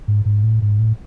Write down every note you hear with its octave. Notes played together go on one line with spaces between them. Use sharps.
G#2
G#2
A2
G#2
A2